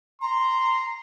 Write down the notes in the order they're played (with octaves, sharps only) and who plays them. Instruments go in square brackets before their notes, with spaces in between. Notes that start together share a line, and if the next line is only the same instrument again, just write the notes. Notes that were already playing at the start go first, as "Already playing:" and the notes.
[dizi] A#5 [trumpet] C6